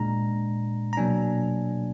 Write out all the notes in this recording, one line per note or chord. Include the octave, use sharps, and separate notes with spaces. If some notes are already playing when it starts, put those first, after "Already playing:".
Already playing: A#2 G#3 D4 A#5
A#5
B2 F#3 A#3 D4 G#5